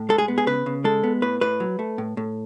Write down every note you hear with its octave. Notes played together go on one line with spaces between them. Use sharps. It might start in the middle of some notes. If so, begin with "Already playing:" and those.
Already playing: A2
G#3 A4
G#4
B3
G#4
C#3 B4
C#3
G#3 A4
B3
A2 B4
A2 B4
F#3
A3
A2
A2